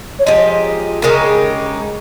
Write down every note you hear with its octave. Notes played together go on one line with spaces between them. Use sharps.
C#5
F3 G#3 D#4 G4 D#5
C#3 G#3 D#4 G4 A#4